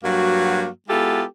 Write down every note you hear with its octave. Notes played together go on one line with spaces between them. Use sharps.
G2 F#3 A#3 F#4
G#3 B3 E4 F4 G4 A4